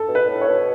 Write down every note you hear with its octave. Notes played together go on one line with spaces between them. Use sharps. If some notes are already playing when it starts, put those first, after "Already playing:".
Already playing: A4
B2
B4
A2
C#5
B2